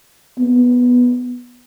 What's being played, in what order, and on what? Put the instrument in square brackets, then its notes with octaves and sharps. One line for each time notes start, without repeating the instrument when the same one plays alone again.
[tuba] B3